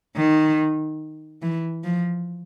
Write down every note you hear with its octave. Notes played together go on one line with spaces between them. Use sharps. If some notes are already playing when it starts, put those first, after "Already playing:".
D#3
E3
F3